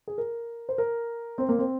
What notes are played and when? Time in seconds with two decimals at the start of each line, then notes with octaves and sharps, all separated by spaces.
0.07 G#4
0.18 A#4
0.69 C5
0.78 A#4
1.38 C4
1.49 A#3
1.59 C4